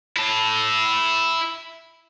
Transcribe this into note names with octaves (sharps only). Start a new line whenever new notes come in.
E4 A5